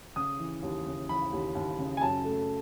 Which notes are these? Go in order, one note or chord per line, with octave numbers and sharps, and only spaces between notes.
C#3 D#6
E3
D#2
C#3
E3 B5
D#2
D#2
C#3
G#5
F#2 A5
A3